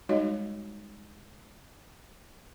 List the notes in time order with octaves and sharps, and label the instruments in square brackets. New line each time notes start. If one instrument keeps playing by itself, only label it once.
[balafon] G3 G#3 D#4 F#4 C#5 D#5